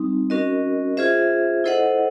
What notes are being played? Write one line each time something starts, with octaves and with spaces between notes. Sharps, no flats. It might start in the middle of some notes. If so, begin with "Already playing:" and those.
Already playing: G3 C4 D#4
C#4 F#4 A#4 D#5
F4 G#4 C5 E5
E4 A4 C5 D#5 F#5